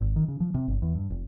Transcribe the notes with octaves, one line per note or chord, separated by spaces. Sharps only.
G#1
D#3
C#3
F3
C3
G1
E2
G2
F1